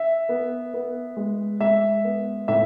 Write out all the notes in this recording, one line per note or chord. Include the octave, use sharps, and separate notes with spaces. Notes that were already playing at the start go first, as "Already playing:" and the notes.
Already playing: E5
B3
B3
G#3
G#3 E5
B3
A2 E5